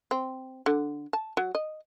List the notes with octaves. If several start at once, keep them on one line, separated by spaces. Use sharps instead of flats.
C4
D3
A5
F#3
D#5